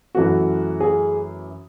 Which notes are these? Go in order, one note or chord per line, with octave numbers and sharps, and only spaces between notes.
F#2 E3 A3 F#4
G#4